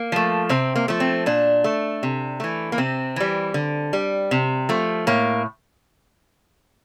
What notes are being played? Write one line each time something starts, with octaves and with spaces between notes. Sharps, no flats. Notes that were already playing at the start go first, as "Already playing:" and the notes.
Already playing: A#3
F3 A3
C3 C4
A#3
F3 A3
C4
A#2 D4
A3
C3
E3 A3
A#3
C3 C4
E3 G3
D3
G3
C3
F3 A3
A2 A#3